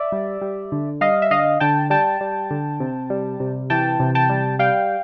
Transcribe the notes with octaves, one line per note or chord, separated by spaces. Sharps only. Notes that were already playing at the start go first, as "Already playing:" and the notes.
Already playing: D5 E5
G3
G3
D3
G3 D#5 F5
E5
D3 D#5 F5
D3 G5 A5
G3 G5 A5
G3
D3
C3
G3
C3
E3 G5 A5
C3
G5 A5
G3
G3 F5 G5